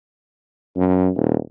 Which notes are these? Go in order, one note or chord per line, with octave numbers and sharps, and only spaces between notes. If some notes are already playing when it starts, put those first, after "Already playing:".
F#2
D#1